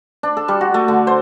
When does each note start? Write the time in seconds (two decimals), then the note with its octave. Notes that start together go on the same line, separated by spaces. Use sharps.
0.23 D4
0.37 A4
0.48 G3
0.61 F#4
0.74 A3
0.88 D3
1.07 C5